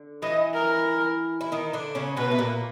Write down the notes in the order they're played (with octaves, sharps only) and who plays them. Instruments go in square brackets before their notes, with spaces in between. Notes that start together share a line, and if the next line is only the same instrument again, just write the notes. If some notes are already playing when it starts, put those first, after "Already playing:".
Already playing: [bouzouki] D3
[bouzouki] E3 E4 [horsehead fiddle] D#5
[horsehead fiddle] A#4
[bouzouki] E4
D#3 D#4
D3 D4
C#3 C#4
[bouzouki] B2 B3 [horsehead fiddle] B4
[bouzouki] A3
A#2 A#3